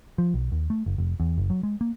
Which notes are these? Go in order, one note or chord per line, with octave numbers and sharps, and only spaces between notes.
F3
B1
D#2
A3
F#1
F1
E2
F#1
F#3
G#3
A#3